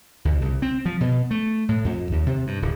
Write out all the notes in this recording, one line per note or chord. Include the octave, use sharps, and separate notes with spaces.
D2
C2
C4
F3
B2
A3
A2
F2
D#2
C3
G2
D1